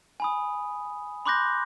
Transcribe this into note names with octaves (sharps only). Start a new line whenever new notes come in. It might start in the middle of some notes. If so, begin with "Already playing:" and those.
G#5 B5 D#6
B5 C6 D6 F#6 G6 A#6